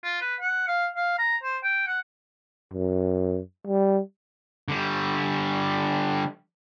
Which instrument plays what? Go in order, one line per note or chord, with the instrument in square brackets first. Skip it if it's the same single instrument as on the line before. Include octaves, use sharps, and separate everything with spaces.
[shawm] F4
B4
F#5
F5
F5
A#5
C5
G5
F#5
[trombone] F#2
G3
[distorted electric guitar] D3 G3